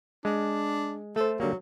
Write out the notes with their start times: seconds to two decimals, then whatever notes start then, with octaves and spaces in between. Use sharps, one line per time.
0.25 G#3 D4
1.16 A3 A4 C5
1.40 D3 F#3 G3 A#3